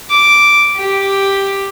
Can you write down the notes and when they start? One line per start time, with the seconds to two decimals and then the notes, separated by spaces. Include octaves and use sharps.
0.10 D6
0.77 G4